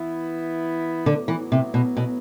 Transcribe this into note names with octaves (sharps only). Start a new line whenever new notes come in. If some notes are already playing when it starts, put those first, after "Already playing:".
Already playing: E3 B3 E4
A2 D3 F#3 B3
E3
C3
B2
B2